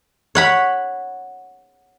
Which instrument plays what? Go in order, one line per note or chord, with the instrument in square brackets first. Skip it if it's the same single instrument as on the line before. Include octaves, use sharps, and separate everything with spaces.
[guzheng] C#5 F#5 B5